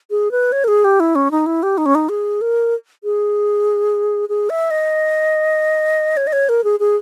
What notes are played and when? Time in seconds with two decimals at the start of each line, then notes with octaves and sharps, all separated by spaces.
0.10 G#4
0.31 B4
0.52 C#5
0.64 A#4
0.68 G#4
0.85 G4
1.00 E4
1.15 C#4
1.31 D#4
1.46 E4
1.63 G4
1.78 D#4
1.86 C#4
1.95 D#4
2.09 G#4
2.41 A#4
3.04 G#4
4.29 G#4
4.50 E5
4.71 D#5
6.17 C#5
6.27 D#5
6.33 C#5
6.49 A#4
6.64 G#4
6.80 G#4